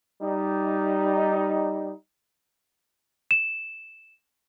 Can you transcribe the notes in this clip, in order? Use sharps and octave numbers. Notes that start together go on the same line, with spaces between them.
G3 D#4
E7